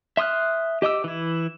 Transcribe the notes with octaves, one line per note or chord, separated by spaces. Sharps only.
E5 C6 D#6 F6 F#6
G4 D#5 D6 E6
E3 E4